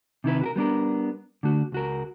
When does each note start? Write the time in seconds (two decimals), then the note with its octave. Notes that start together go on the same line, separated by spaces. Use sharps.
0.24 C3 D#3 E4 B4
0.41 F#4 G4 A#4
0.56 G3 B3 D4 A#4
1.43 D3 A3 F#4
1.72 C#2 F#4 A#4